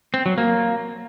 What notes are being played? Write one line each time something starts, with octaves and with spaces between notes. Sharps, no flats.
C4
F#3
A#3